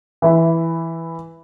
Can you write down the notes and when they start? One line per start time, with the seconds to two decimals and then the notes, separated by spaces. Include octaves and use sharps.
0.22 E3 E4 B5